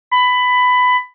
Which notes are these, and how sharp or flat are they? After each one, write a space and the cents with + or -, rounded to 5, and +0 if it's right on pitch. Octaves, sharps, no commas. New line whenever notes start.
B5 +15